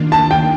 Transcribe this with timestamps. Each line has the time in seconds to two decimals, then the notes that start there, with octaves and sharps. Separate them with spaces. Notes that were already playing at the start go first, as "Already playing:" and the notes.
Already playing: D#3 A#3 D4 F4
0.12 A5
0.31 G5